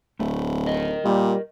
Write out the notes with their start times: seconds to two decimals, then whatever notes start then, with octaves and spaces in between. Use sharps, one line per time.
0.19 D1 A3
0.67 A#4 D#5
1.05 A#2 G3